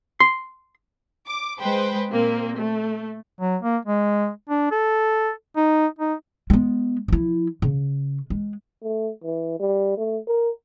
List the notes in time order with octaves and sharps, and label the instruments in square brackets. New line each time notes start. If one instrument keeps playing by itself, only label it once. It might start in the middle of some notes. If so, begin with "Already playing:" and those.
[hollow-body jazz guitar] C6
[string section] D6
G#3 B4 C5 G5
A#2 A#3 C4
A3
[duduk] F#3
A#3
G#3
D4
A4
D#4
D#4
[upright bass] G#3 B3
F3 E4
C#3
G#3
[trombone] A3
E3
G3
A3
A#4